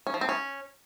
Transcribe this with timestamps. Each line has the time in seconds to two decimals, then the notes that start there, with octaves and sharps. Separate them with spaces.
0.07 C#4
0.14 F3
0.21 C4
0.29 C#4